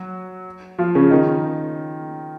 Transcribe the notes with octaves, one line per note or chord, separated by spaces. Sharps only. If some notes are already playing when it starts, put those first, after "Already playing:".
Already playing: F#3 F#4
F3 F4
C#3 C#4
D#3 D#4